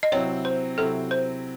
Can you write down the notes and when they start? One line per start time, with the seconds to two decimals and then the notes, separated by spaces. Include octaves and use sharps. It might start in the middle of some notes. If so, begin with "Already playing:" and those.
0.03 D#5
0.12 C3 F#3 C4 E4 C#5
0.45 C5
0.78 C3 F#3 C4 E4 A4
1.11 C5